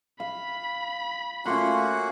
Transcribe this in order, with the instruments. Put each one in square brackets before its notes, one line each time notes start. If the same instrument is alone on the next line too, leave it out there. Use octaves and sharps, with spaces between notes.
[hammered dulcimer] F5 [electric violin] B5
[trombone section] A3 F4 [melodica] A#3 F#4 F#5 [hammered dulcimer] C#4 C6